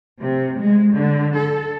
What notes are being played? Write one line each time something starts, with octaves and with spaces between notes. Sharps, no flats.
C3
G#3
D3
A4